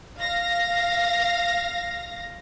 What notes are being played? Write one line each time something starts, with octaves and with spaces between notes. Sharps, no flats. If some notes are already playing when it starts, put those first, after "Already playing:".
F5 A#6